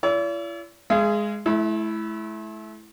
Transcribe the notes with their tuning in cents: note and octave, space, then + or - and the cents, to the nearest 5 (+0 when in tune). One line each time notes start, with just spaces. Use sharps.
E4 +45 D5 -45 E6 +0
G#3 +0 G#4 +10 F5 -40
A3 -40 E4 +0